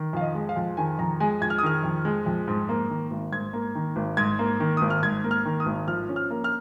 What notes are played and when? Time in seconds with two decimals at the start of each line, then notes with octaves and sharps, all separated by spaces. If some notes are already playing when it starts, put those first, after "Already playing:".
Already playing: D#3
0.13 F2 F5
0.21 D#5
0.35 G#3
0.49 F5
0.56 F2
0.77 D#3 G#5
0.99 F2 A#5
1.20 G#3 G#5
1.41 F2 G#6
1.50 F6
1.58 D#6
1.63 D#3 F6
1.84 F2
2.05 G#3
2.26 F2
2.48 G#2
2.69 A#3
2.90 D#3
3.11 G#1
3.32 G#2 G#6
3.53 A#3
3.75 D#3
3.96 G#1
4.17 G#2 G#6
4.39 A#3
4.60 D#3
4.77 G#1 D#6
4.90 F6
5.03 G#2 G#6
5.24 A#3
5.31 F6
5.45 D#3
5.60 D#6
5.66 G#1
5.88 F3 F6
6.09 C#4
6.16 F6
6.31 A#3
6.44 F6